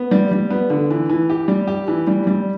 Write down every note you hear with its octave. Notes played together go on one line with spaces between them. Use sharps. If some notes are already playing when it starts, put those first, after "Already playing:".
Already playing: B3
G3
G3
B3
D3
E3
E3
G4
G3
G4
E3
G3
G3